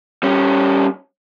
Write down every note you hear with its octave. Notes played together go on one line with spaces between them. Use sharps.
G3 C#4